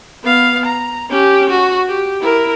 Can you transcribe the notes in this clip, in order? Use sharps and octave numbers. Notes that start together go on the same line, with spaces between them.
B3 F5
A#5
C#4 G4
F#4
G4
E4 A#4